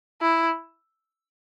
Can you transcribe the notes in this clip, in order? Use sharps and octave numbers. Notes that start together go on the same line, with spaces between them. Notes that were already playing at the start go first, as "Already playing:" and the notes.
E4